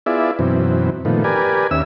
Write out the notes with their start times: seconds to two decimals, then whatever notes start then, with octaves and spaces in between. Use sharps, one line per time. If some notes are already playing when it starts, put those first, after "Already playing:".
0.06 B3 E4 F4 G#4 D5 E5
0.39 F#2 B2 E3 C4
1.05 A#2 D#3 F3 A3 B3
1.24 G4 A#4 B4 D5 G#5
1.71 D#2 C#4 E5 E6